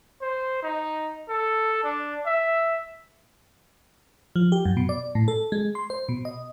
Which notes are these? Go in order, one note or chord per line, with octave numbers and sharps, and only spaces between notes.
C5
D#4
A4
D4
E5
F3
G4
F#2
B2
D5
A2
A4
G#3
C6
C5
B2
D#5